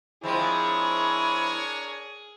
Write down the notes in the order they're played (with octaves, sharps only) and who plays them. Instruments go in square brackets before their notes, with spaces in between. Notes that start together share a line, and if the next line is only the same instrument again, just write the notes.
[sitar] F3 G#3 C4 [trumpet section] D4 A#4 C#5 [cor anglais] E4 [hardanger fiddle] G#4